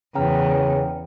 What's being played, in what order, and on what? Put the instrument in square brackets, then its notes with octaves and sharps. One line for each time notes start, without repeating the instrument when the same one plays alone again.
[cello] E2 [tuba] C#3 [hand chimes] G5 A#5 F6